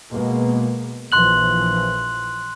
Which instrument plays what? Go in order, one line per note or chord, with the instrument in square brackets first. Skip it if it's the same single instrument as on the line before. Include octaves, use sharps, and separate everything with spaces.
[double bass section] B2 G#3 A#3
[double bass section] A#1 E3 F3 [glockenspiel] C6 F#6 F#7